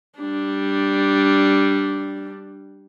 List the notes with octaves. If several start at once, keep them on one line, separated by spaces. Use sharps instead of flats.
G3 D4